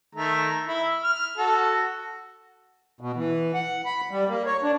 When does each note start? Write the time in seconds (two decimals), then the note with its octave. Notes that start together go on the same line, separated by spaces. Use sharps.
0.15 D#3 A3 A#5
0.68 E4 E5
1.04 F6
1.38 F#4 A4
3.01 B2
3.16 E3
3.54 F#5
3.85 B5
4.11 G3
4.29 A#3
4.46 C#5
4.63 D4